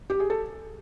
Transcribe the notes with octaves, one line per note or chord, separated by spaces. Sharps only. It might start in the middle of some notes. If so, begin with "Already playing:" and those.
G4
G#4
A4